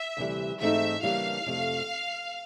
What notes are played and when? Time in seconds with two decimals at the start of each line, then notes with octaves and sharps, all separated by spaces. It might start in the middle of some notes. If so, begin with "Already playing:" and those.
Already playing: E5
0.17 D2 C3 E3 G3
0.60 G#2 E3 A3 C4 D#4 E5
1.03 C#3 E3 G3 A#3 D4 F5
1.46 F2 C3 F3 A3